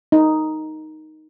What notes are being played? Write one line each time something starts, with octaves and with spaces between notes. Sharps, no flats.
D#4